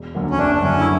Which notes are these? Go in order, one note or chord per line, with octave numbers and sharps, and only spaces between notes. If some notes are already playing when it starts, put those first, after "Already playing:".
Already playing: E1
D2 D3 F#3 A#3
C#4
F#1 D4
D4
F#2 D3 C#4
E4